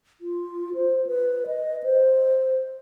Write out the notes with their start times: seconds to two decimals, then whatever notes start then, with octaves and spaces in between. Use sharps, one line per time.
0.21 F4
0.75 C5
1.07 B4
1.47 D#5
1.84 C5